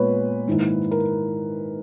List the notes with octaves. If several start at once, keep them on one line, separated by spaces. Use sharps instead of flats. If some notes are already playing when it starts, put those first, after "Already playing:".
Already playing: A#2 G#3 B3 B4 C#5
G#2 D#3 A#3 E4
A#4